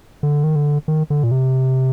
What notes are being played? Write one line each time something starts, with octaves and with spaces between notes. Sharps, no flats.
D3
D#3
D3
D#3
D3
A#2
C3